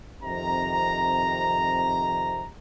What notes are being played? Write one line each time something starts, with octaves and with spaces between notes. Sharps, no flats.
F2 C3 D#3 A#5